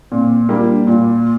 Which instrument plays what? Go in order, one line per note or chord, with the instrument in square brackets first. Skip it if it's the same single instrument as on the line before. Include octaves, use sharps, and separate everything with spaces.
[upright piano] A#2 [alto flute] C4
[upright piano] G3 A#3 [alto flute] D4
[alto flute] F4
D4
[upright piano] A#2 [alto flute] F4